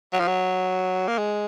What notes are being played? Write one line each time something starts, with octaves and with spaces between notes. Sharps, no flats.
F#3
F3
F#3
A#3
G#3